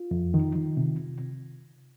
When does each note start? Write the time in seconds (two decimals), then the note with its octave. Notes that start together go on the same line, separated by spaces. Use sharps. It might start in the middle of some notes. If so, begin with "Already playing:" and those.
Already playing: F4
0.11 F2
0.34 D#3
0.55 D#3
0.77 C3